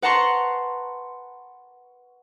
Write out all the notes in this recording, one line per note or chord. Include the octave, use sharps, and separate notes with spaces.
B4 F#5 A5 A#5 C6 C#6